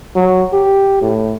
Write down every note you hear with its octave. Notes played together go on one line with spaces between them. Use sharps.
F#3
G4
A2